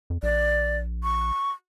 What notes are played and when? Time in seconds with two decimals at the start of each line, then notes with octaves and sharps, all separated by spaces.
0.10 F2
0.23 A#1 D5
1.03 C#6